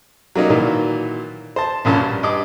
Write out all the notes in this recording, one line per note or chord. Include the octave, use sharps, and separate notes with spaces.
F#3 G3 A#3 C#4 D#4
A#2 D#3 E3 F#3
C5 A5
A#1 F#2 A#2 C#4 A5
G2
G2 D#5 D6